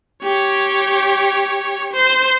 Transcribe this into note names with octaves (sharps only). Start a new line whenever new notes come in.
G4 C#5
C5